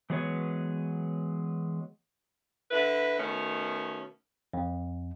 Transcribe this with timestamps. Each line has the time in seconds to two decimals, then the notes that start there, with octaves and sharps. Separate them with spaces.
0.10 E3 F#3 G#3 B3 B4 C#5
2.71 D3 E4 B4
3.19 B2 D#3 A3 C#4
4.53 F2